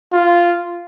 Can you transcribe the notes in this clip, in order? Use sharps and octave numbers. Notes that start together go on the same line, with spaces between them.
F4